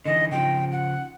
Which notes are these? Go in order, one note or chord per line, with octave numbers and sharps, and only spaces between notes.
D3 E3 D#5
C#3 F3 G5
F#5